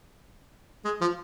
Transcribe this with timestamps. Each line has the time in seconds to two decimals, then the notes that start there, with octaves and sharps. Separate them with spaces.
0.85 G#3
1.01 F3